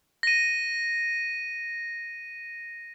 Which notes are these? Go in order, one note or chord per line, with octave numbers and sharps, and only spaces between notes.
A#6 D#7